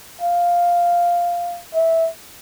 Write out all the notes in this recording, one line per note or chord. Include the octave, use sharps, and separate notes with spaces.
F5
E5